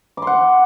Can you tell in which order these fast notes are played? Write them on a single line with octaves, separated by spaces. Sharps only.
D6 C6 F#5